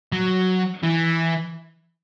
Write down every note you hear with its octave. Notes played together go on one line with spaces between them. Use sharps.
F#3
E3